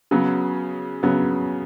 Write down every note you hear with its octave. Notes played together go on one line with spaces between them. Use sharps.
C#3 F#3 B3
C#3 F#3 B3